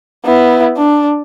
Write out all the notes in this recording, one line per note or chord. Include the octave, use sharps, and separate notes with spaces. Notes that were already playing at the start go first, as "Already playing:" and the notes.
B3 E4
D4